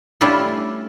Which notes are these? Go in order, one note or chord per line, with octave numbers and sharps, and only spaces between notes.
G3 A3 C#4 D4 E4 F4